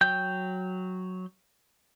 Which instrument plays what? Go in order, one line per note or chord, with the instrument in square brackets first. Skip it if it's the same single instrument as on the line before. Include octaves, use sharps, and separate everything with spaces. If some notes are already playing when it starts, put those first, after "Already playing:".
[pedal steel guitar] F#3 G5 G6